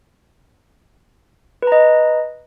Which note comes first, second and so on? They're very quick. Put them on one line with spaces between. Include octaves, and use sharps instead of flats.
B4 A#5 D#5